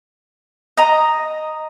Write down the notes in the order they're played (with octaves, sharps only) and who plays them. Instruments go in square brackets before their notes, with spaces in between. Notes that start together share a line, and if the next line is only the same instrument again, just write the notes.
[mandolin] D#5 A#5 D#6